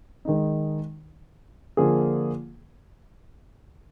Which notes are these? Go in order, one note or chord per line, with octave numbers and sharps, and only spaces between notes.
D#3 G#3 D#4
D3 F3 A#3 F4 G#4